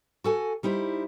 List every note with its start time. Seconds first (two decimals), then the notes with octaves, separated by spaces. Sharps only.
0.24 F#4 A4 G#5
0.63 G3 D#4 E4 C5